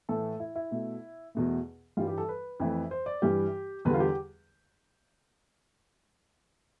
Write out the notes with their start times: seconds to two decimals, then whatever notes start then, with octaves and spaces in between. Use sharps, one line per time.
0.09 A2 E3 A3 A4
0.40 E4
0.56 E4
0.71 B2 A3
1.35 E2 B2 A3
1.97 G2 E3 G3 F4
2.08 G4
2.18 A4
2.29 B4
2.60 F2 E3 A3
2.91 C5
3.06 D5
3.22 G2 E3 G3 G4
3.85 E2 D3 G3 B4
3.94 F4
4.00 G4